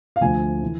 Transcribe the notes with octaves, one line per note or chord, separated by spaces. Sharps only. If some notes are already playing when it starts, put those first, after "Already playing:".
F5
D2 D3 F3 G#5
E3